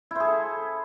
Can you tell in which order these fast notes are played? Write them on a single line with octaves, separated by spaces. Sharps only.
E4 C5 G#4 A4